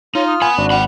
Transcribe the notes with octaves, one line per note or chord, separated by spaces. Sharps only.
D#4 F4 C#5 F6
D#6
F#5 G#5 B5
G#1 D4 F#4
F#5 G5 B5